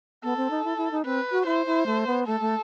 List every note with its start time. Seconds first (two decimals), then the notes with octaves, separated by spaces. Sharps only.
0.23 B3 A4
0.37 C4
0.51 D#4
0.64 E4
0.77 E4
0.91 D#4
1.05 C4 B4
1.32 F#4
1.46 E4 C5
1.66 E4
1.86 A3
2.07 B3
2.27 A3 A4
2.40 A3